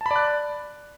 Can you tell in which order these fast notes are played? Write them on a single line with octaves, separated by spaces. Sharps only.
A5 B5 D5 F#6